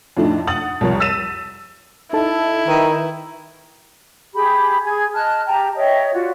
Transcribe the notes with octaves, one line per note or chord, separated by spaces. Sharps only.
F2 A2 A3 D4 D#4
F#5 D#6 A6 F#7
C2 F2 A#4 C#5
E6 A6 B6 D#7 E7
D#4 E4 A4 A5
D#3 B4
G4 G#4 B5
G#4 G#5 G#6
D#5 A5 F6 F#6
G4 G5 A5 A#5
C#5 D#5 E5 G5
F4 F#4 D5